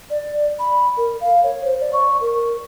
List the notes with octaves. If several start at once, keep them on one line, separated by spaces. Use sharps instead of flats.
D5
B5
A#4
F5
C#5
C5
D5
C#6
A#4